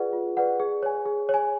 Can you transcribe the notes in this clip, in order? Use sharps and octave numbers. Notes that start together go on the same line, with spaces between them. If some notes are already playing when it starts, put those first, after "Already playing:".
Already playing: F4 G#4 B4 D5 F#5
F4
G#4 B4 D5 F#5
G#4
C#5 G#5
G#4
C#5 G#5